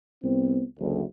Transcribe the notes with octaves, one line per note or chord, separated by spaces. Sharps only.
C2 B3 C4
F#1 D2